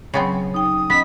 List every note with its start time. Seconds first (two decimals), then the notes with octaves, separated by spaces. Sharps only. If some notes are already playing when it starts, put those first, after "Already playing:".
0.14 C#3 F#3 B3 C4 C#6 G#6
0.54 D#4 G5 D#6
0.90 B3 C#4 D#5 B6